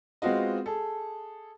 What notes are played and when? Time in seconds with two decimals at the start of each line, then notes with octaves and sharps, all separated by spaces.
0.22 G#3 B3 C4 F4 F#4 D#5
0.66 G#4 A4